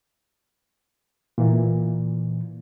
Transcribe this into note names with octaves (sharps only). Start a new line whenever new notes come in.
A#2 E3